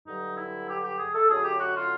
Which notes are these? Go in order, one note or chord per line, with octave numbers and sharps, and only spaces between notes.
G2 D3 F#3 D#4
E4
G4
G4
G#4
A4
F#2 D3 F#3 G#4
G4
F#4
F4